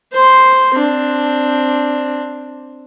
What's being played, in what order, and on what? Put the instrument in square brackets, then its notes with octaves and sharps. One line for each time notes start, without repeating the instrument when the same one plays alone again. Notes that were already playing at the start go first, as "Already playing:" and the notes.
[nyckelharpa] C5 C6
C4 D4